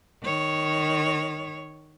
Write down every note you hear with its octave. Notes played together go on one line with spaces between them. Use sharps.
D#3 C#5